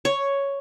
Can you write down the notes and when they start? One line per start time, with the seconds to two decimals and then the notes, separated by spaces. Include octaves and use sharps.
0.05 C#5